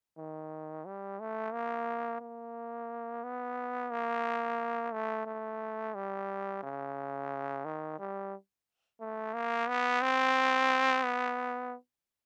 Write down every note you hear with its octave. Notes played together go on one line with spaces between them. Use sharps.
D#3
G3
A3
A#3
A#3
B3
A#3
A3
A3
G3
C#3
D#3
G3
A3
A#3
B3
C4
B3